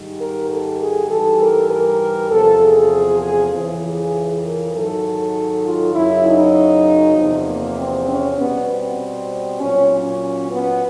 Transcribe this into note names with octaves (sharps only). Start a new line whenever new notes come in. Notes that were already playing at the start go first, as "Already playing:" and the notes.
Already playing: G#2 D#3 G3
A#4
A4
G#4
G#2 E3 G3 A4
A#4
A#4
E2 C3 F3 A4
G#4
G#4
F2 C#3 E3
G#4
A#4
G#2 D#3 F#3 A4
F4
F#2 C#3 F#3 E4
D#4
E2 C3 F3
A#3
C4
C#4
B2 G3 B3
C4
A#2 F#3 C#4
C#4
B3